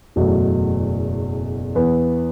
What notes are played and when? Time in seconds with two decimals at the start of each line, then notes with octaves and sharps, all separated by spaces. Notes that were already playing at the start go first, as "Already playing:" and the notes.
0.16 F#1 E2 B2 F#3 A3
1.75 E2 E3 B3